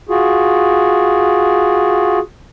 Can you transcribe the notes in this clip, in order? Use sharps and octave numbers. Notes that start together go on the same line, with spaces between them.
F4 F#4 G#4